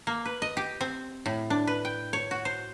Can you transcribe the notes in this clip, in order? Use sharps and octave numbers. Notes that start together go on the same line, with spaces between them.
A#3
B4
D#5
G4
C4
A2
D4
B4
G5
C#5
F#4
C5